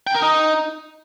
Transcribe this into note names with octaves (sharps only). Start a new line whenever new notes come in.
G5
A#4
D#4